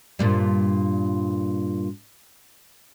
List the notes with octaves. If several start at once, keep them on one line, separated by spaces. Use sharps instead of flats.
G2 A#2 G3